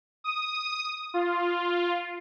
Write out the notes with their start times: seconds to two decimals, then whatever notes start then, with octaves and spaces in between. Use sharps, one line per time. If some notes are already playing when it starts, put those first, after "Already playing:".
0.24 D#6
1.14 F4